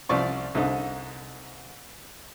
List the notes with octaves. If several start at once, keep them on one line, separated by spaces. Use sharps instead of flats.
C2 F3 D5 C#6
C2 D3 D#4